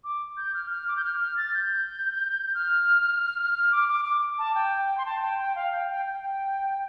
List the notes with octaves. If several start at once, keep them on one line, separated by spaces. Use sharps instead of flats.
D6
G6
F6
F6
D6
G6
F6
F6
A6
G6
F6
F6
D6
D6
D6
A5
G5
C6
A5
G5
G5
F5
G5
G5
G5